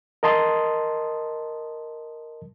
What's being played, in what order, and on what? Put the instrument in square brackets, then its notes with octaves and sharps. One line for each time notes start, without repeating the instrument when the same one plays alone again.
[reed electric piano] A#4 D#5 A5 C6 D#6